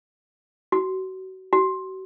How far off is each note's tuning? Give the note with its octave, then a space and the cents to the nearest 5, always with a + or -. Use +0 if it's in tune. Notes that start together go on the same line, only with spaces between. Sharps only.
F#4 +30
F#4 +40